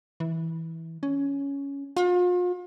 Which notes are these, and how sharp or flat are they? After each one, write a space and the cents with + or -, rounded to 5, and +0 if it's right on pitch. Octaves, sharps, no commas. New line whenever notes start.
E3 -15
C#4 +10
F4 +40